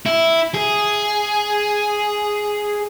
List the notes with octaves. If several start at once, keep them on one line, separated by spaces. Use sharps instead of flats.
E4
G#4